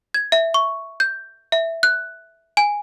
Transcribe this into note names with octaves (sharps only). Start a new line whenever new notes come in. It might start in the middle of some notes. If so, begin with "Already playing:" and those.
G#6
E5
C#6
G6
E5
F#6
G#5